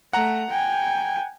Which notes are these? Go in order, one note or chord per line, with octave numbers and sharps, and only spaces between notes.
A3 F#5 A#5
G5 G#5